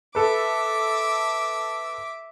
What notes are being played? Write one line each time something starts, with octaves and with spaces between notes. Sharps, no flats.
A4 B4 E5 D6